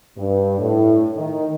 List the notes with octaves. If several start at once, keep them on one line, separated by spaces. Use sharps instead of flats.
G2
A2
D#3